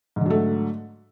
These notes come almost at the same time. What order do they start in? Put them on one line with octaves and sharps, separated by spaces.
G#2 D3 F#3 A3